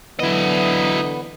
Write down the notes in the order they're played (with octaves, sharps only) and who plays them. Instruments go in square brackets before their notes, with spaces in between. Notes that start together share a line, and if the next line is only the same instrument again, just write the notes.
[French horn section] D3 E3 [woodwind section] F#3 [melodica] B3 [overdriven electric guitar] E4 D#5